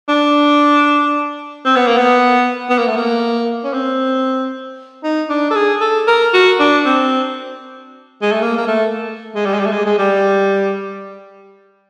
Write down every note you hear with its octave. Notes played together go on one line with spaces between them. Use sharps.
D4
C4
B3
A#3
B3
B3
A#3
A3
A#3
C#4
C4
D#4
D4
A4
G#4
A4
A#4
F#4
D4
C4
G#3
A3
A#3
A#3
A3
G#3
G3
G#3
G3
A3
G#3
G#3
G3